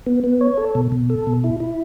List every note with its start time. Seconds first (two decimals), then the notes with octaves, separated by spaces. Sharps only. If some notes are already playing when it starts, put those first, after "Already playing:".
0.06 B3
0.24 B3
0.41 C#5
0.58 A4
0.75 B2
0.92 B2
1.10 A4
1.27 B2
1.44 E4
1.60 E4